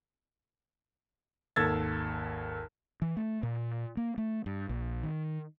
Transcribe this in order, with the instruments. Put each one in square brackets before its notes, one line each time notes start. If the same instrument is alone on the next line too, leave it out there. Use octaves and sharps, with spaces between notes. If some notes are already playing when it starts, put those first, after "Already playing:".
[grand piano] G#1 D#2 A4 E6 G#6 A6
[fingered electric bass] E3
A3
A#2
A#3
A3
G2
A#1
D#3